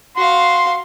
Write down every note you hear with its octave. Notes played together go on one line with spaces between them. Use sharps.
F#4 F5 C6